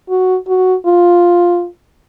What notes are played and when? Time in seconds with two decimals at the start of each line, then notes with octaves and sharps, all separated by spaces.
0.09 F#4
0.48 F#4
0.86 F4